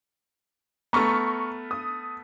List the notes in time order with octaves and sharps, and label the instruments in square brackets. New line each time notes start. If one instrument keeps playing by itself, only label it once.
[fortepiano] A3 B3 [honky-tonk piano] A#5 C#6 F6
[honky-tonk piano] D#6